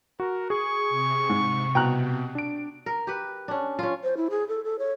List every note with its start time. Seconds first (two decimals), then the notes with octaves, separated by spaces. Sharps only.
0.20 F#4 A#4
0.50 G#4 C#6
0.89 C3
1.29 G#2
1.75 B2 G5 A#5 F#6
2.35 D4 D7
2.86 A#4
3.07 G4 B4
3.48 C#4 D4
3.79 C#4 F4
4.04 C5
4.17 E4
4.30 G#4
4.49 A4
4.64 A4
4.79 C#5